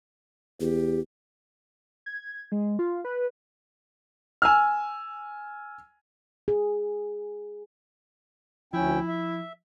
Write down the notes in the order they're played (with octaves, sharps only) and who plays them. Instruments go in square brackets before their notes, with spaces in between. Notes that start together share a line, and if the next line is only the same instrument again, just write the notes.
[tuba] E2 [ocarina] G4
[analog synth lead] G#6
G#3
F4
B4
[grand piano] G#5 E6 F6
[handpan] G#4
[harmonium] D2 C#4 G5 [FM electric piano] F3 [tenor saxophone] E4
[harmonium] E5